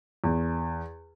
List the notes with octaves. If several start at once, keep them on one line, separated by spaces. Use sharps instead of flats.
E2